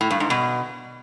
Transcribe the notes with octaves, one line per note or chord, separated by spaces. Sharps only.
A2
G2
G#2
B2